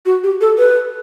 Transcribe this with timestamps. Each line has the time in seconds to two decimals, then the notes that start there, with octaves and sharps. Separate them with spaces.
0.06 F#4
0.24 G4
0.41 A4
0.58 B4